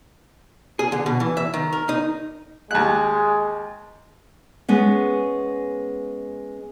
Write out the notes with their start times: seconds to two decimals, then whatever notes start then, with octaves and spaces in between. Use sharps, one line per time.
0.79 G#4
0.92 D3
1.06 B2
1.20 E3
1.37 E5
1.54 D#3
1.73 A#4
1.89 D#4
2.71 D#2 G#3 F#6
4.69 G#3 B3 C#4